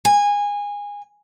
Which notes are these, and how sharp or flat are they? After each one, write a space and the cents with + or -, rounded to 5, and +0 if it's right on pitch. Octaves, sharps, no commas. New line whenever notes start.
G#5 -20